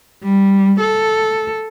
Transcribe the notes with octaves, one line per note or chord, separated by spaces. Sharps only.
G3
A4